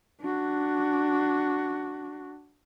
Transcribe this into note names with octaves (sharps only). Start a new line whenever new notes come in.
D4 F#4